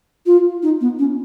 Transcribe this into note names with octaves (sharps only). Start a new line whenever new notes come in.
F4
D#4
B3
C#4